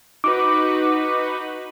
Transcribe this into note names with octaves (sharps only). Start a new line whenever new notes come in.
D#4 F#4 B4 D6